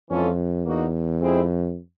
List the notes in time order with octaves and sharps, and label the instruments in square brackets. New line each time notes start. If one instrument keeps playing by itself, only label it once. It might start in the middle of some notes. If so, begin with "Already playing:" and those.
[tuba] F2 [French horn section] E3 G#3 C#4 F4 A4
[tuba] E2 [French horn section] A#3 D#4 F#4
[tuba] F2 [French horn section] B2 G#3 C4 E4 G#4